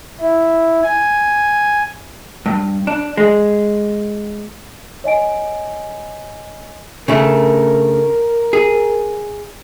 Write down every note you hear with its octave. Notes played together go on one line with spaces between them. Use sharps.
E4
G#5
G2
D4
G#3
C#5 D#5 G#5 D7
C#3 A3 D4 A#4
G#4